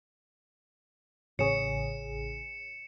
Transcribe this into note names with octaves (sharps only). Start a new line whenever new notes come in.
A1 C#3 G#4 C#5 C#7 E7